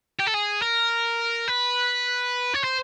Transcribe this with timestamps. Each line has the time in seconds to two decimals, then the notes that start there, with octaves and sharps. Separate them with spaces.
0.20 G4
0.27 A4
0.35 G#4
0.62 A#4
1.48 B4
2.54 C#5
2.64 C5